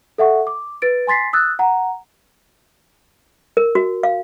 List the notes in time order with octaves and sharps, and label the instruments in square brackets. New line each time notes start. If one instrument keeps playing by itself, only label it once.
[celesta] A4 E5 F#5 C#6
D6
B4 A6 D7
G#5 C6 A6 B6 C7
D#6 E6 F#6 A6
F#5 A#5
[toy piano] A#4
F#4
F5